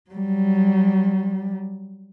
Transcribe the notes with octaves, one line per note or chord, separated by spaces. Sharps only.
F#3 G3